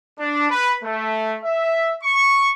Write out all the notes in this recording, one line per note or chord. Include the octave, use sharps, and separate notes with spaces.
D4
B4
A3
E5
C#6